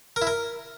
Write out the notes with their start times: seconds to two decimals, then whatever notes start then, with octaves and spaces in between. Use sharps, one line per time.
0.16 A#4
0.22 E4
0.27 A#4